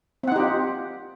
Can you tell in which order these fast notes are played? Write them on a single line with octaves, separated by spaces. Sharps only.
C4 F#5 D#4 G4 F4